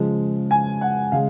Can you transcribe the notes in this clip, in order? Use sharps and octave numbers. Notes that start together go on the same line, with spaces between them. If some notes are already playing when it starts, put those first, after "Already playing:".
Already playing: C#3 F3 G#3
G#5
F#5
C#3 G#3 F5